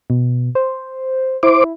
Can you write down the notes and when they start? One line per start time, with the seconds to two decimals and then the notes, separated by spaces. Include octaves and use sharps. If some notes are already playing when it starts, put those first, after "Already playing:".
0.10 B2
0.55 C5
1.43 E4 C5 D6